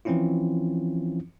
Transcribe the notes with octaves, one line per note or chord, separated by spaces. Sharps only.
E3 F3 C4 C#4 E4 F4